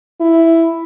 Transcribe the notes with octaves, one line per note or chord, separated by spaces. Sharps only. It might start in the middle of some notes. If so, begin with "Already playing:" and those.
E4